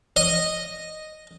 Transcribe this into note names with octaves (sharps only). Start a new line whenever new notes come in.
D#5